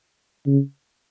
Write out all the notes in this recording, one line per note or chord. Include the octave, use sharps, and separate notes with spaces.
C#3